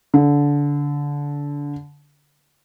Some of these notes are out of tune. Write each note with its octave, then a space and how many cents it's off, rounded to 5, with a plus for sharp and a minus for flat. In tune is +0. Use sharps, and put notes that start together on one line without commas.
D3 -25